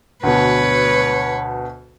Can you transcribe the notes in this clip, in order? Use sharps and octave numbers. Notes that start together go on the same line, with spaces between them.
D2 B2 B4 C#5